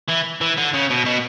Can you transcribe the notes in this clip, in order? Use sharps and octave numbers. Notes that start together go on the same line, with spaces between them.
E3
E3
D3
C#3
B2
B2